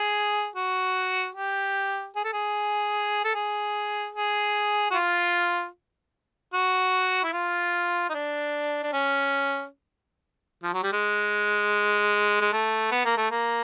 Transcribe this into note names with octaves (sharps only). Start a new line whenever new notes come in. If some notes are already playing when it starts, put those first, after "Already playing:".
Already playing: G#4
F#4
G4
G#4
A4
G#4
A4
G#4
G#4
F#4
F4
F#4
E4
F4
D#4
D4
D4
C#4
F3
F#3
G3
G#3
G#3
A3
B3
A#3
A3
A#3